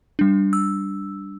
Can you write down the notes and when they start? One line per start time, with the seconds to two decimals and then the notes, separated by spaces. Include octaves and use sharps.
0.19 G3 D4
0.53 E6